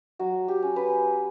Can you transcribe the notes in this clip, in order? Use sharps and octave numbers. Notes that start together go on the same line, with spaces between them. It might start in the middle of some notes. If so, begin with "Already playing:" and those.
F#3 F#4
G4
C#4
B4